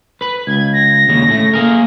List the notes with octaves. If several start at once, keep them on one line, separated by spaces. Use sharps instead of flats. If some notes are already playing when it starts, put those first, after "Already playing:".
B4 B5
C#2 G#6
A#6
D#2 C#3
A2 A3
A#3 G#4 A#4